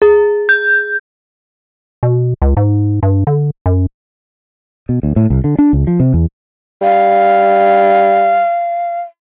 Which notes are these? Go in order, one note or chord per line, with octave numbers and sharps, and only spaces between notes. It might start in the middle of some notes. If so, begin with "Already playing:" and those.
G#4
G6
B2
C#2
G#2
G2
D3
F#2
B2
D2
A2
C2
D3
D4
C#2
F3
C3
E2
G3 F5